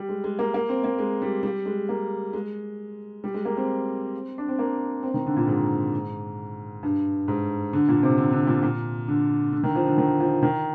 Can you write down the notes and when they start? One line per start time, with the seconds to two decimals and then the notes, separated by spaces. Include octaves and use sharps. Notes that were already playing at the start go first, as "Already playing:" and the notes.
Already playing: G3
0.09 G#3
0.24 G#3
0.39 A#3
0.54 A#3
0.69 C4
0.84 A#3
0.98 G#3
1.22 G3
1.43 G3
1.66 G#3
1.89 A#3
2.33 G#3
3.24 G3
3.34 G#3
3.45 A#3
3.57 C4
4.38 D4
4.49 C4
4.59 A#3
5.03 C4
5.14 D#3
5.26 D3
5.37 A#2
5.48 G#2
6.83 G2
7.28 G#2
7.73 D3
7.88 A#2
8.03 C3
8.18 D3
8.32 D3
8.47 A#2
8.63 A#2
9.08 D3
9.53 D3
9.63 D#3
9.75 F3
9.87 D3
9.98 D#3
10.21 F3
10.43 D#3